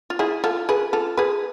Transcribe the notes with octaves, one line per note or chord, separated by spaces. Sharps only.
F4
E4 G#4
F4 A4
G#4 B4
F4 A4
G#4 B4